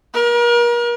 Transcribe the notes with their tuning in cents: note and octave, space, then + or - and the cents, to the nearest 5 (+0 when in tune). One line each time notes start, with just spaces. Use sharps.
A#4 +35